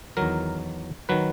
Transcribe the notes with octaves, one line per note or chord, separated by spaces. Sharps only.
E2 D#3 F#3 A#4
D#3 F#3 B4